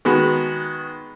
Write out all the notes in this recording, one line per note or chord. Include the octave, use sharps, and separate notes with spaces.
D#3 G#3 B3 F#4